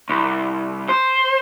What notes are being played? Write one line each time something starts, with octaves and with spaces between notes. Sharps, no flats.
C2
C5